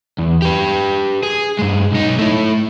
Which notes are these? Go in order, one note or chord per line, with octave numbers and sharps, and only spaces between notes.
E2
G4 B4
G#4
G2 G#3
B1 D#4
A3 E4